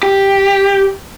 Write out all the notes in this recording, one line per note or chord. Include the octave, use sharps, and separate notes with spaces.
G4